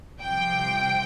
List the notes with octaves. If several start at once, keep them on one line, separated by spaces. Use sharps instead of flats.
C2 C3 F3 G5